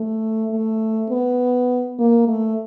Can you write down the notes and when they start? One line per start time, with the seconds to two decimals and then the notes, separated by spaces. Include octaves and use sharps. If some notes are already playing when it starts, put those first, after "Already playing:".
Already playing: A3
0.51 A3
1.10 B3
1.99 A#3
2.28 A3